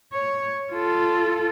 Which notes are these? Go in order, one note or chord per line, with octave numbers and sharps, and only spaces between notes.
C#5
F4 A4